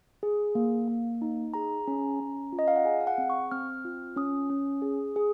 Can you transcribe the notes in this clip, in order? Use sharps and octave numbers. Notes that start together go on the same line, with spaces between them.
G#4
A#3
A#3
D#4
G#4 A#5
C#4
C#4
F4
D#5
F5
F#5
G#4 G#5
F5
F#5
C4
C#6
C4 F6
F4
C#4 D#6
C#4
G#4
G#4